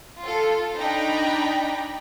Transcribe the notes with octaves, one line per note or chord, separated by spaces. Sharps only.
F4 A4
D4 D#4 G5 A#5 B5